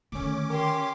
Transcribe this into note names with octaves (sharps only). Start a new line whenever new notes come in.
D3 D#3 A3 C#4 D6
G4 A#4 C6